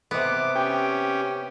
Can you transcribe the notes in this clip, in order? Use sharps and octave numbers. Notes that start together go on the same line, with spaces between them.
C3 B3 D6
C#4 G4 G5